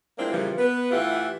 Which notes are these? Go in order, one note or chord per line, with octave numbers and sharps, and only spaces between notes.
F3 G#3 A#3 C4 D4 E4
A#2 C#3 E3 F3 G3
B3 B4
A2 E3 F4 G4 E5 F#5